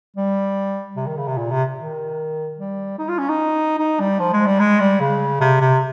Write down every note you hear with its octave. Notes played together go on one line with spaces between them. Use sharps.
G3
C3
D#3
C#3
C3
A#2
C3
D#3
G3
D#4
F4
C#4
D#4
D#4
G3
F3
G#3
G3
G#3
G3
C#3
C3
C3